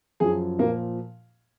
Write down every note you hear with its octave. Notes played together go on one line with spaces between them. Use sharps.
F#2 F3 G#4
A#2 F3 A#3